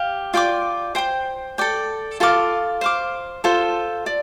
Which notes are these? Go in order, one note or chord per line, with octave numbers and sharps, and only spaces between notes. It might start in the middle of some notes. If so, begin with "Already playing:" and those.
Already playing: G4 F5
F4 D5 G5 D6
C5 G5 C6
A4 D5 G5
F4 A4 F5 D6
C5 F5 D6
F4 A4 C5
D5